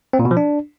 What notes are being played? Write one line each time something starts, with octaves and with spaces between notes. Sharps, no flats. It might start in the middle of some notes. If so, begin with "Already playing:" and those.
C4
A#2
B2
F3
D4